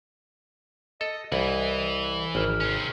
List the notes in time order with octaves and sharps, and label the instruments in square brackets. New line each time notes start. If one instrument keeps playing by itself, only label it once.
[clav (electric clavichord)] A4 [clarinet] D#5
[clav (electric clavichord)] C2 [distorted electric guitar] E3 [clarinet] D#5
[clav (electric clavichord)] G#1 [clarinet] A#4
[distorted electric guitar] C3 C#4